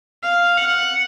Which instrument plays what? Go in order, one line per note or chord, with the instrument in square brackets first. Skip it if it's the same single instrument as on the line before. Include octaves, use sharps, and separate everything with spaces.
[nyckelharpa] F5
F#5